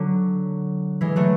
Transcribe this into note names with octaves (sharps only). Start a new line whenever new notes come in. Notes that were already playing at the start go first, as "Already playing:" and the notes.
Already playing: D3 F#3
E3 G#3
F#3 A3